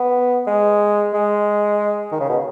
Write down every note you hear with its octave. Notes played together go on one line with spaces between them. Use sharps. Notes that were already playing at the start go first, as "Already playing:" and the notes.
Already playing: B3
G#3
G#3
D#3
C#3
B2